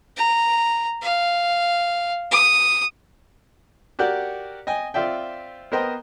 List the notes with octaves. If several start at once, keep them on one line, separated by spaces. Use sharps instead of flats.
A#5
F5
D#6
F#4 G4 A#4 D5 F#5
D#5 G5 G#5
C4 F4 D5 E5 G5
B3 A#4 C5 D#5 G5 A#5